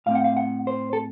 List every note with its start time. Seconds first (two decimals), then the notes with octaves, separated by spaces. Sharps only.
0.06 A2 A3 C4 F5
0.15 F#5
0.24 F5
0.37 F#5
0.67 C5
0.93 A4